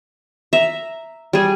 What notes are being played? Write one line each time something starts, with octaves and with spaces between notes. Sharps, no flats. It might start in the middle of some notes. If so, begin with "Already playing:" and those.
E5 A#5
G3 G#4